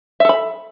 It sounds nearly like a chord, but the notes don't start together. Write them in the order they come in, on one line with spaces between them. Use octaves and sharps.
E5 A4 B5